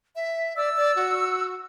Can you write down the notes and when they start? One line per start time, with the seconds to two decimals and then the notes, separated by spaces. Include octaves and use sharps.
0.16 E5
0.56 D5 E6
0.77 D5
0.96 F#4